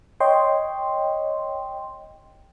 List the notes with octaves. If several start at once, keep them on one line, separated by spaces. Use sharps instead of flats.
C#5 D#5 G5 C6